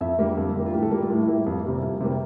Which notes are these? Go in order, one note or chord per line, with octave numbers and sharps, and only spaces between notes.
F2 E5
D3 G3 A#3
F2
D3 G3 A#3
F4
A2 G4
A4
G3 A#3
F4
A2
E4
G3 A#3
F2
C3 G3 A#3
F2
C3 G3 A#3